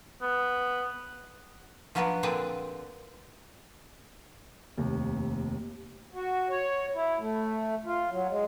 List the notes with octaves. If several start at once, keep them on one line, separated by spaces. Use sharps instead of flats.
B3
F3 F#3 B3 D4 F#4 B4
A#2 D3 C4 G#4 B4 D5
F1 D#2
F#4
C#5
E4
A3
F4
F#3
G#3